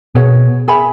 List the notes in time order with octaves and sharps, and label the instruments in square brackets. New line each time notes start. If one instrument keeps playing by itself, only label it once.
[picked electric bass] B2 [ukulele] G#4 C#5 F#5
[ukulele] G#4 E5 G#5 B5